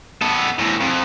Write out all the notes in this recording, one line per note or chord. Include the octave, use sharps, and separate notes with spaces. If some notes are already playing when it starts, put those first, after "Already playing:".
B3 A4
E2 A2
F2